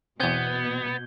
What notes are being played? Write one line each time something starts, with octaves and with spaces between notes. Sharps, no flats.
E2 B2 B3 C4 G6 G#6 G7